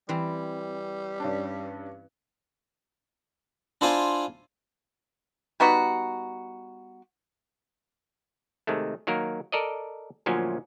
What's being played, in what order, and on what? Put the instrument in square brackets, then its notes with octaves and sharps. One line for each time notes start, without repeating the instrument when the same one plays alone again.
[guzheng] E3 C4 [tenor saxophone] G3
[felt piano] G2 C#4 D4
[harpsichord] D4 E4 F4 C5 D5 G#5
[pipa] G3 B3 D#4 F#4
[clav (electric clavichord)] C3 D#3 G#3 A3
D#3 F#3 A#3 A#4
A4 A#4 D5 D#5
D2 A#2 F3 F#3 C#4